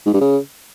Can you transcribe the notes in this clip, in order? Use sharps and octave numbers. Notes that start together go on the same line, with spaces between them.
G#2
G2
C#3